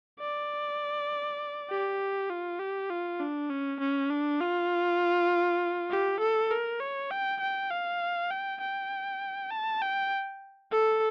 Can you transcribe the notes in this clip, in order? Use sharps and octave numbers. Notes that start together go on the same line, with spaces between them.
D5
G4
F4
G4
F4
D4
C#4
C#4
D4
F4
G4
A4
A#4
C#5
G5
G5
F5
G5
G5
A5
G5
A4